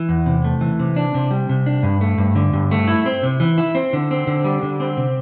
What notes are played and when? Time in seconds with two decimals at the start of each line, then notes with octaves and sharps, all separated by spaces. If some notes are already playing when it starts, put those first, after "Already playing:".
Already playing: E3
0.09 E2
0.26 C3
0.44 A3
0.61 E3
0.80 C3
0.96 D4
1.14 C3
1.31 G3
1.49 C3
1.66 D4
1.83 G2
2.01 A3
2.18 G2
2.35 D3
2.53 G2
2.71 A3
2.88 E4
3.06 C4
3.23 C3
3.40 E3
3.58 E4
3.75 C4
3.93 D3
4.11 C4
4.27 D3
4.44 G3
4.63 D3
4.80 C4
4.97 C3